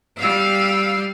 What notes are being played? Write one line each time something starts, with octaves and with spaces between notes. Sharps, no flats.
G3 F5 E6